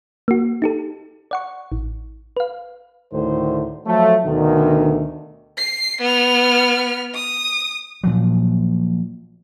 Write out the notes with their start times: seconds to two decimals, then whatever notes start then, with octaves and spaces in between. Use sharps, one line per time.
0.28 A#3 F#4
0.62 D#4 G4 A4
1.31 D5 F#5 C#6
1.72 A1
2.37 B4 F5
3.13 D2 A2 D3 D#3 C5
3.86 F3 F#3 A3
4.25 D2 B2 D3 D#3
5.58 C7
6.02 B3 F6
7.15 D#6
8.04 A#2 F3 F#3